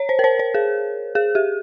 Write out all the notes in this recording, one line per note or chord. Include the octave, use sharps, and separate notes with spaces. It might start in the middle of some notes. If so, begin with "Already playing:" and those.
Already playing: C#5
C5
A#4
C5
C5
G#4
G#4
G4